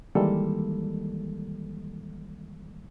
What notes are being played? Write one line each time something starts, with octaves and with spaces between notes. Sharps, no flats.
D#3 E3 G3 G#3 A#3 A4